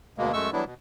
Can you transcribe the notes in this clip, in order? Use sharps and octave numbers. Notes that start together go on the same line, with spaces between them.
D2 B2 G#3 A#3
F#2 G#3 A3 C#6 E6
E3 F#3 G3 B3 D4 E4
B2